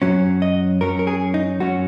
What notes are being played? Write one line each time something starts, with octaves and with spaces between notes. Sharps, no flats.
F#2 F#3 C#4
D#5
F#2 F#3 C#4 A#4
A#4
G#4
D#4
F#2 F#3 C#4 F#4